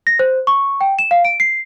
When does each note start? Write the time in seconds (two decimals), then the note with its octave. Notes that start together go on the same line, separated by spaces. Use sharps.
0.07 A#6
0.19 C5
0.47 C#6
0.81 G5
0.99 E7
1.11 F5
1.25 D7
1.40 C7